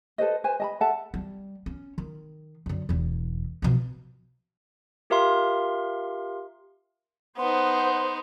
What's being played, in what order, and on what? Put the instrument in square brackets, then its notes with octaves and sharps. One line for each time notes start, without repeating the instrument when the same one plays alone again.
[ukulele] A4 B4 C5 D#5
B4 C5 G#5
D#5 A5 B5
A4 E5 F#5 A5
[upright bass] G3
C#4
D#3
F#2 D3
E1 E2
B2 F3
[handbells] F4 G4 A#4 E5 F5 C6
[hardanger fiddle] B3 D#4 [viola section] C5 [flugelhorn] F#5 [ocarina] C6